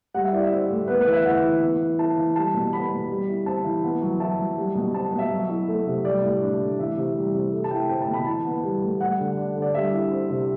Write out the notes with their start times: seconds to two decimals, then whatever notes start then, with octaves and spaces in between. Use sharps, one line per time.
0.14 G3 F#5
0.24 E5
0.33 E4 D5
0.44 E5
0.51 C4
0.70 A2
0.87 B3 B4
1.01 B4
1.06 E3
1.13 E5
1.25 E4 F#5
1.44 E3
1.62 B3
1.81 E3
1.99 E4 A5
2.17 E3
2.36 G3 A5
2.54 B2
2.72 B3 B5
2.91 B2
3.10 G3
3.28 E4
3.46 C4 A5
3.65 E3
3.83 B3
4.02 F#3
4.20 E4 A5
4.38 F#3
4.57 G3
4.75 B2
4.94 C4 A5
5.12 B2
5.19 E5
5.31 F#3
5.49 E4
5.68 A3
5.86 C3
6.04 G3 D5
6.23 A2
6.42 D4
6.60 A2
6.79 E3 E5
6.97 C3
7.16 G3
7.34 C3
7.52 A3
7.64 A5
7.71 E4 G5
7.89 C4 G5
8.02 A5
8.08 B2
8.14 B5
8.26 E3 A5
8.45 B3
8.63 G3
8.82 A2
9.00 G3 F#5
9.19 D3
9.37 D4
9.56 D3
9.62 D5
9.74 G3 E5
9.92 E4
10.11 C4
10.29 C3